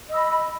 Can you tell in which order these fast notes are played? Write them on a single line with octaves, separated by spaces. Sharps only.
D#5 E6 B5